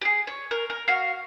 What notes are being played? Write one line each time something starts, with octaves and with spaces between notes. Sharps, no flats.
G4 G#4
C#5
A#4
A#4
F#4 F5